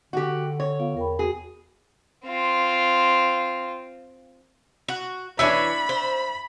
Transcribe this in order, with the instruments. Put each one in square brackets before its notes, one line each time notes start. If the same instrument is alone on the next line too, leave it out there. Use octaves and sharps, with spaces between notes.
[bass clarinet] D3 [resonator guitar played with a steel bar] F#4 G4
[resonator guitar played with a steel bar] C#5
[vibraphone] B3 F4 F5
[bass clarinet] E2 [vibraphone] A#4 G5 B5
[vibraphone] F#4 [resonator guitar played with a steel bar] G#4
[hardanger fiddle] C4 F4
[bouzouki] F#4
[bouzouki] E3 C#5 G#5 [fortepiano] D4 E5 [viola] B5
[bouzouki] C5